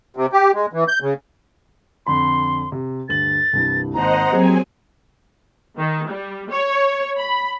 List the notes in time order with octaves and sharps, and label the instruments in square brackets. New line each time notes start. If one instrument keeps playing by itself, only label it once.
[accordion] C3
G4
G#3
E3
G6
C#3
[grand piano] F2 D3 B5 [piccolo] C6
[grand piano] C3
[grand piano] D2 G2 F#7 [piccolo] A6
[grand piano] C2 G2 E3
[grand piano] G#1 A#3 A5 [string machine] C5 D#5 F#5 [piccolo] A#5
[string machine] F#3 C4 G#5 [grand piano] A#3 G4 G#4
[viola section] D#3
G3
C#5
B5